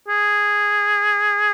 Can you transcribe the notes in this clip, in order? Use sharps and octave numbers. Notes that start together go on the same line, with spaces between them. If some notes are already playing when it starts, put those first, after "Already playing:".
G#4